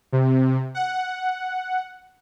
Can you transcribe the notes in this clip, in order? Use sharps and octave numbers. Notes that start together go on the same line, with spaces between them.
C3
F#5